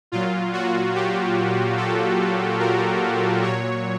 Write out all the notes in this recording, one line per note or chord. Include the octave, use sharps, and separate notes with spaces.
A#2 F#3 F4
F#4
G4
A4
A#4
A#2 F#3 C#5